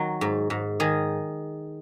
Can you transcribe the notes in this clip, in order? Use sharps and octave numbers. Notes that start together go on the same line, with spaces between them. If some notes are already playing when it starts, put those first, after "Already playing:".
Already playing: D#3 F#3
G#2
G#2
D#3 G#4